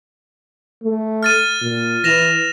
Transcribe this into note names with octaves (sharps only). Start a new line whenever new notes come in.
A3
F6 A6 D#7
A#2
E3 A#6 E7 F7